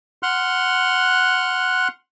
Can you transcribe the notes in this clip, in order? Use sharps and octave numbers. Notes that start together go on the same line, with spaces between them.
F#5 C6 F6 F#6